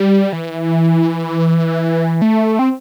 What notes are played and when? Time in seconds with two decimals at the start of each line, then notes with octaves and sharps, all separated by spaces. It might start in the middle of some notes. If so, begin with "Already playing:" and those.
Already playing: G3
0.33 E3
2.22 A3
2.59 C4